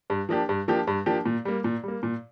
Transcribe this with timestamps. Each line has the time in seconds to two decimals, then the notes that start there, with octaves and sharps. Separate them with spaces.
0.10 G2
0.29 F3 A#3 D4 G4
0.49 G2
0.68 F3 A#3 D4 G4
0.87 G2
1.06 F3 A#3 D4 G4
1.26 A#2
1.45 G3 A#3
1.64 A#2
1.84 G3 A#3
2.03 A#2